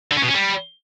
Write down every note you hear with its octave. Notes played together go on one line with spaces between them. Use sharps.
D3
C#4
B2
C#4
G3